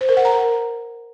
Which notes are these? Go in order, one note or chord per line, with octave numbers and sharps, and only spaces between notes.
C5
A#4
F#5
A#5
A#4